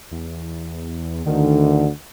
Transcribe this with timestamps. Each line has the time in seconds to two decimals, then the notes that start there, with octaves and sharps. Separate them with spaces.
0.11 E2
1.26 D2 D3 D#3